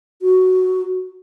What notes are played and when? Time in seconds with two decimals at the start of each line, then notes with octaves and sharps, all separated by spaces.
0.22 F#4